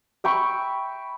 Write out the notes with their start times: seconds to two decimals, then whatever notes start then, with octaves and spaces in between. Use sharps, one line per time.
0.24 E5 G5 B5 C#6